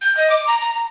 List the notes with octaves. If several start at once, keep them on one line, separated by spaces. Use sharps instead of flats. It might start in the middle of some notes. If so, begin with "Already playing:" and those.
G6
D#5
D6
A#5
A#5
A#5